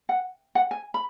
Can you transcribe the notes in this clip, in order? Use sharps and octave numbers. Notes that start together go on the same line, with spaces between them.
F#5
F#5
G#5
B5